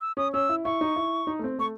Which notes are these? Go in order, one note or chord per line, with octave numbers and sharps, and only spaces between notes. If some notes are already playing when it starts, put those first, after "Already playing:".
E6
C#4 D#6
C#4 E6
E4
E4 C#6
D#4
E4
D#4
A3
C4
A3 C#6